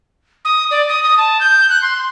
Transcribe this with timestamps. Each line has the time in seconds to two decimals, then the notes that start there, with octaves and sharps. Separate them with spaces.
0.45 D#6
0.71 D5
0.89 D#6
1.04 D#6
1.18 A5
1.41 G6
1.70 F#6
1.82 C6